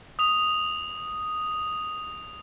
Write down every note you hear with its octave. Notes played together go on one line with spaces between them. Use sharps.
D#6 F7